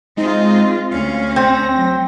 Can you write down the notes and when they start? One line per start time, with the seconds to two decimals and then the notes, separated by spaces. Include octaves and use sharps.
0.17 G#3 C4 D#4 F4 D#5
0.92 D2 C#4 F5
1.36 C4 A#6
1.76 F#3